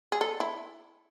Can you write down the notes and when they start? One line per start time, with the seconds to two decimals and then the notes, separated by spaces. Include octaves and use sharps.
0.12 G#4
0.21 A4
0.40 E4